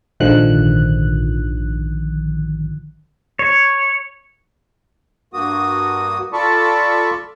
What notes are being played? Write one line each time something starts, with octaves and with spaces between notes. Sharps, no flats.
A#1 G#2 D3 D#3 F3 F#6
C#5
G2 A#3 F#4 D#6
F4 A4 D5 A5 B5 C#6